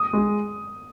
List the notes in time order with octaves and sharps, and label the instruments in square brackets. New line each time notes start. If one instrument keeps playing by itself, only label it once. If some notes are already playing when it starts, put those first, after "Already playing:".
Already playing: [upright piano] D#6
[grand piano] G#3